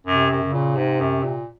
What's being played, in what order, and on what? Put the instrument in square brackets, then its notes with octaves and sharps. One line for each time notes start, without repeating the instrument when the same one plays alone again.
[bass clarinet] F#2 [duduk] C3
[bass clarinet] F#2
[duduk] C#3
[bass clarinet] A#2
[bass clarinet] G#2 [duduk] C3
[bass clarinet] F#2
A#2